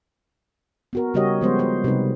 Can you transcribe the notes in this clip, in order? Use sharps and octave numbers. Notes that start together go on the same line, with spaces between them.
B3 F#4 A#4
C#3 G3 F#4 G4 C#5 D#5
F3 G3 G#3 B3 C5
B4 C5
C3 G3 D#4 B4